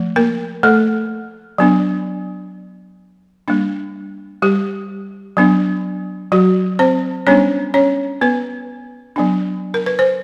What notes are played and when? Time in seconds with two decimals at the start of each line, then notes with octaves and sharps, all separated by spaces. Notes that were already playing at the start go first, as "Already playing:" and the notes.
Already playing: F3 A3
0.16 A#3 A#4
0.63 A3 A4
1.58 F#3 B3 D4
3.48 G3 A#3 D4
4.42 G3 G4
5.37 F#3 B3 D4
6.32 F#3 F#4
6.79 C4 C5
7.27 G3 B3 C#4 D4 C#5
7.74 C#4 C#5
8.21 B3 B4
9.16 F#3 B3 D4
9.74 A#4
9.86 B4
9.99 C5